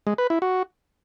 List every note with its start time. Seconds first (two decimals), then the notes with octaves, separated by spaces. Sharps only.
0.07 G#3
0.18 B4
0.30 E4
0.42 F#4